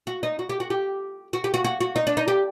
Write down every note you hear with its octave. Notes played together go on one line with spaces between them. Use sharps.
F#4
D#4
F#4
G4
F#4
G4
F#4
G4
F#4
F#4
F#4
D#4
D4
D#4
G4